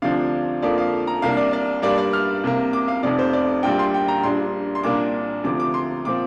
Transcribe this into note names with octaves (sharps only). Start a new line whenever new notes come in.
D2 C3 F3 D4 F5
F2 D3 F3 A#3 D5
F5
A#5
C2 C3 A#3 D4 F5
D5
D5
G2 G3 A#3 D4 D5
D5
F6
C2 C3 A#3
D6
F5
F1 F2 C3 D5
C5
D5
A#1 A#2 G3 G5
C6
G5
A#5
A#1 A#2 G3 D4 C6
C6
C2 A#2 A#3 D4 D6
D2 C3 F3 D6
D6
C6
A#2 F3 C4 D6